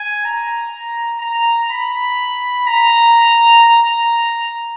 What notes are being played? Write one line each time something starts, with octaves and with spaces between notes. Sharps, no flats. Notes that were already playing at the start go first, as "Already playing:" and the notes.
Already playing: G#5
A#5
A#5
B5
A#5
A#5